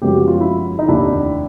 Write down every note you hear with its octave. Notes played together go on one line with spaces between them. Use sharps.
F#2 C#3 F3 G#3 B3 G4
F#4
F4
E4 F#4
D#4
F1 D#2 D3 D4 E4